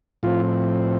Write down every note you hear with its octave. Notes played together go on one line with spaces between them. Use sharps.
A2 F3 C4 F4